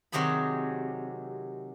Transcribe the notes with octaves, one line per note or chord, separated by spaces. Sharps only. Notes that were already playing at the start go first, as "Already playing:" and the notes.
C3 D#3 F#3 G4 G#4 B5